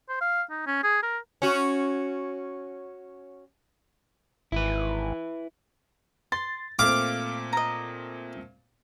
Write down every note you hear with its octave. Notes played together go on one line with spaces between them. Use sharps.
C5
F5
D#4
C#4
G#4
A#4
C#4 F#4
G#1 E4 B4
C6 A6
A#2 A3 C4 F5 D6
D#5 A#5